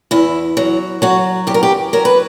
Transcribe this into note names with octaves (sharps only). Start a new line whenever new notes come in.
E2 E4
F#3
F#3 F#4
E2 G4
A#4
G4
F#3 A#4
B4